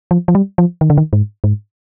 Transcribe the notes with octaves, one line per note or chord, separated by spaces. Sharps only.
F3
F3
G3
F3
D#3
D3
D#3
G#2
G#2